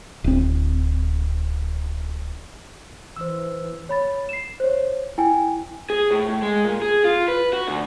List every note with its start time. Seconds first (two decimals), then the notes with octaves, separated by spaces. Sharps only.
0.24 D1 C4
3.16 E3 C5 E6
3.89 C#5 B5 A6
4.29 C7 E7
4.60 C5 C#5
5.18 E4 G5 G#5
5.90 G#4
6.11 A2
6.29 A2
6.42 G#3
6.65 A#2
6.82 G#4
7.05 F4
7.28 B4
7.53 F#4
7.68 D2